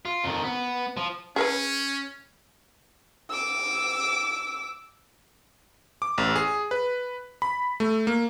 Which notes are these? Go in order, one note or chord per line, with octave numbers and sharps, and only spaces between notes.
F4
F2 D#3
B3
F3
C#4 G#4 A#4 B4
D6 E6
D6
A1
G#4
B4
B5
A3
A#3